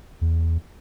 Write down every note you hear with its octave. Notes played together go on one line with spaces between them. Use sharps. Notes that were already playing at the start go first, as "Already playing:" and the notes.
E2